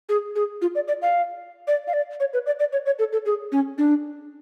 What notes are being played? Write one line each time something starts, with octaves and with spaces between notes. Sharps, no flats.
G#4
G#4
F4
D5
D5
F5
D5
F5
D5
C#5
B4
D5
D5
C#5
C#5
A4
A4
G#4
C#4
D4